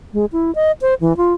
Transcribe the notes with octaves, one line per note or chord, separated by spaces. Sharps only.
G#3
E4
D#5
C5
E3
F4